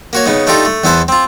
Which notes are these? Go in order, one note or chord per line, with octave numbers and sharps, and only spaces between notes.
A#3 F#4 C#5
C#3 B3 D#4
A3 D4 D#4 F4 G4 A4
A3
E2 E3 B3 E4 C5 A5
C4 F4